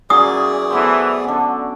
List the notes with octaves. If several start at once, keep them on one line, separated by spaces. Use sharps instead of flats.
E2 A#2 F#3 C#4 G#4 D5 D#6
E3 A3 B3 C5
D3 C#4 D4